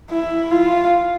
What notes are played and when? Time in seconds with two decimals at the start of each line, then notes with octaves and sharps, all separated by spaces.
0.11 E4
0.51 F4